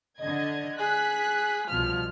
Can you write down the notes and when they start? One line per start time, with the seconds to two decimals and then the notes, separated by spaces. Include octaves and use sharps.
0.20 D3 D#5 G#6
0.79 G#4 F#6 B6
1.70 C2 B2 F3 F6